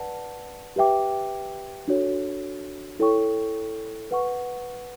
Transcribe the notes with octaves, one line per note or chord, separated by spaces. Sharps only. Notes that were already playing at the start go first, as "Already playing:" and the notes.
Already playing: B4 D5 F#5 A5
G4 B4 E5 G5 D6
D4 F#4 A4 C#5
E4 A4 C#5 G5 C#6
B4 F#5 C#6